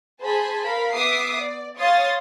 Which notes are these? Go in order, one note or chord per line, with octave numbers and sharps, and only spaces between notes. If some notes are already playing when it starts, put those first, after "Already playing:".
G#4 C5 G#5 A5 B5
A#4 F5 B5
B3 E5 D6 D#6 C7
D5
C#5 F5 C6 D#6 A6